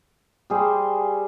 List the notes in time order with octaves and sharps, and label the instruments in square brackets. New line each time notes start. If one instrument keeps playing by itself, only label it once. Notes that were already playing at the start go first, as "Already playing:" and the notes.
[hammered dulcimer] G3 G#4 C5